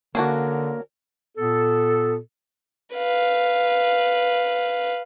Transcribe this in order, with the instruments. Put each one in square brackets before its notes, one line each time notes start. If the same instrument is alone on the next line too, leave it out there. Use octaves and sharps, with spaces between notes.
[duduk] D3 [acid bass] A#3 [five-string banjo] C#4 D4 F#4 [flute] A#4
[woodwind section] A#2 B3 A4
[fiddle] B4 F5